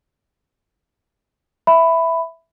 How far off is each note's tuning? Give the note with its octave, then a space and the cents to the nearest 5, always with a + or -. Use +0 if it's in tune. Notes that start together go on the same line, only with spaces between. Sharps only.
E5 +0 B5 +10